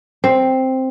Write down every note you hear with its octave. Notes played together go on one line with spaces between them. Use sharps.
C4